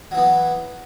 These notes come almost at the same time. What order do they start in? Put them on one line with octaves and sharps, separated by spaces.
F#3 E3 B3